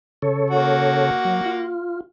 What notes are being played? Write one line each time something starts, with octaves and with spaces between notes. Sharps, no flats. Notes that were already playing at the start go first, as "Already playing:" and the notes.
C#3 A4 C#5
A#3 F#4
F#3
F4